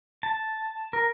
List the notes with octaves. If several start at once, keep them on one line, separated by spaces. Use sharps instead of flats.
A5
A#4